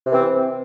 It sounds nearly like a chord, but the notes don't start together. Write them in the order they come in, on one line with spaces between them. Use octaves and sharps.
C3 E3 C4